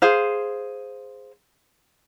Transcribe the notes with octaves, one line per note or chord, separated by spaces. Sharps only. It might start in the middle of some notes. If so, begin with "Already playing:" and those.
G#4 C5 F5